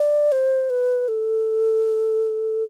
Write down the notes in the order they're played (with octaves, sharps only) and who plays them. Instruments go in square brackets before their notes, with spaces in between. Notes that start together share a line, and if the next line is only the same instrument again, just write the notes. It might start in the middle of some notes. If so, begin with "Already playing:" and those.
Already playing: [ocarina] D5
C5
B4
A4